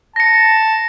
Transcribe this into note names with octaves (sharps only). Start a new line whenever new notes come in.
A5 A#6 C#7